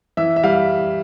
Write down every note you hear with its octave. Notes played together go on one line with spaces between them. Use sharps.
E3 E5
E5
G3 F5